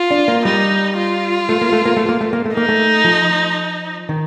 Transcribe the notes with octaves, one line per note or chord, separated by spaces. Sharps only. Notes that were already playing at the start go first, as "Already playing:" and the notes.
Already playing: F4
D4
A#3
G3 D#4
F4
A3
A#3
A3
A#3
A3
A#3
A3
A#3
A3
A#3 D#4
A3
F3
D#3